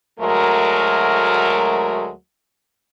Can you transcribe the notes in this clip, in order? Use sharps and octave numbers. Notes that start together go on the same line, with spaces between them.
D2 F#3 G#3 A3 A#4